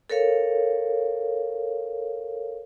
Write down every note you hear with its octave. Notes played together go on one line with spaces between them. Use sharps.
A4 A#4 C#5 F5